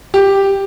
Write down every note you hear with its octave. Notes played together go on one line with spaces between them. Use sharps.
G4